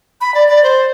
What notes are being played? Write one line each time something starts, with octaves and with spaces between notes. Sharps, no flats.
B5
D5
D5
C5